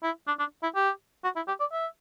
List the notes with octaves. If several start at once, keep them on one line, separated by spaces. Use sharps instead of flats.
E4
D4
D4
E4
G4
F#4
E4
G4
D5
E5